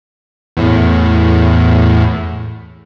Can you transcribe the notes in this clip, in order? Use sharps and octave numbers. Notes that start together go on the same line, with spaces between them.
E2 A2